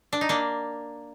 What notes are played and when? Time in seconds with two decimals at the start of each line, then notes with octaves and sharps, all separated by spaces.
0.13 D4
0.21 D#4
0.29 A#3 D4